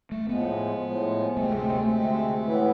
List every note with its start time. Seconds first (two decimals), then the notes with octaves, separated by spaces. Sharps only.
0.12 A3
0.29 A2 F3 G#3 B3
0.83 A2 F3 G#3
1.37 D2 C3 G#3 A3 C4
1.55 A3
1.73 A3
1.91 D2 C3 G#3 C4
2.45 A2 E3 B3 E4